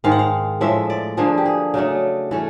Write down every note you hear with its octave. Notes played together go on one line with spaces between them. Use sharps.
G#2 D#3 G#3 F5
F#5
F5
A2 F3 G#3 E5
D5
D3 F3 A#3 D4 G#4
G4
G#4
C#3 F#3 A3 D4
E3 A3 C#4 A4